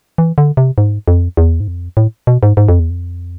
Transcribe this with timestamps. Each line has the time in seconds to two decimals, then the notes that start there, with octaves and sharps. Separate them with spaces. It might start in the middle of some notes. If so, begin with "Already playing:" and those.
0.18 E3
0.38 D3
0.57 C3
0.78 G#2
1.08 F2
1.37 E2
1.60 G#2
1.68 F2
1.97 A2
2.27 B2
2.43 G#2
2.57 G#2
2.69 F2
2.80 E2
2.90 F2